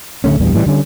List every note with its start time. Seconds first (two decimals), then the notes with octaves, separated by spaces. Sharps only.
0.24 D1 D3 A3 C#4
0.40 A#1 E2 G2 G3
0.55 A2 E3 G3
0.66 D3 G3 C#4